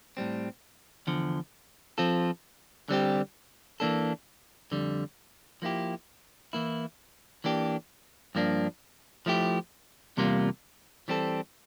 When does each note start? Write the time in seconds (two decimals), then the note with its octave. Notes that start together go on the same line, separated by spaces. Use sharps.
0.17 A2 G3 C4
1.07 E2 D3 F3
1.98 F3 C4 F4 A4
2.89 D3 G3 C4 G4
3.80 E3 A#3 D4 A4
4.71 F2 D3 G3
5.62 F3 A#3 E4 G4
6.53 E3 A#3 E4
7.44 E3 A#3 D4 G4
8.35 G2 F3 A#3 D4
9.26 F3 A3 E4 G4
10.17 E2 C3 G3 A#3 F4
11.08 E3 G3 C4 F4 A4